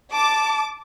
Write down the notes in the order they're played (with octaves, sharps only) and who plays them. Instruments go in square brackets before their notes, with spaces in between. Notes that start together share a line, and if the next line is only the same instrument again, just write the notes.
[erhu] A5 [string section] D6